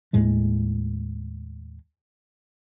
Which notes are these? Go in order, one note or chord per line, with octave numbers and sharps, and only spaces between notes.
D#2 A2 G#3 A3